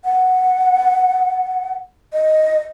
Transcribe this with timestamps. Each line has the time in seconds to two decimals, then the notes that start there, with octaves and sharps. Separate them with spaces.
0.04 F#5
2.13 D#5